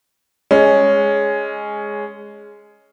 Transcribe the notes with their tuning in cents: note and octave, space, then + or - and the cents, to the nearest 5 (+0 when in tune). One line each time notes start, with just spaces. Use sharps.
G#3 +0 C#4 +5